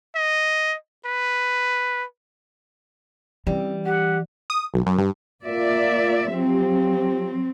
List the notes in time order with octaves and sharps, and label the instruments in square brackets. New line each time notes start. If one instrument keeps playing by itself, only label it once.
[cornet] D#5
B4
[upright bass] E3 C#4 [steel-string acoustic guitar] G3 [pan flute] C4
[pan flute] G4 [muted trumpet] F#5
[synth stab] D#6
B1
F#2
G2
[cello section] A#3 D5 E5 [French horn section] F4 A#4
[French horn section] F3 G4 [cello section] F#3 C4